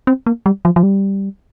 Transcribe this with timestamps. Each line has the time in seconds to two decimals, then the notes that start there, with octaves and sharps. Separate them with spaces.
0.07 C4
0.26 A#3
0.46 G3
0.65 F3
0.76 F3
0.83 G3